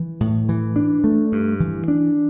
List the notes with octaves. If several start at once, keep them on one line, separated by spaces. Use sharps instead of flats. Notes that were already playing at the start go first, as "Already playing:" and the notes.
Already playing: E3
A2
E3
D4
A3
G2
E3
D4